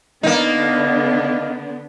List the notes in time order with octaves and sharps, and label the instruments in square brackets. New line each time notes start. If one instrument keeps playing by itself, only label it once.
[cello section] D3 B3 D4 [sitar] A#3 D#4